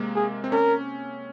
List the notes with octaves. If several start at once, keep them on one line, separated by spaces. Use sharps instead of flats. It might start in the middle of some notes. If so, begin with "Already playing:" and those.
Already playing: C3 G#3 A#3
G#4
C4
C#4 A#4